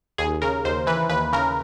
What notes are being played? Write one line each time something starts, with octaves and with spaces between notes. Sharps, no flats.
D#2 G#4
C#3 A#4
D#2 C5
E3 B4
D#2 B4
C#3 A#4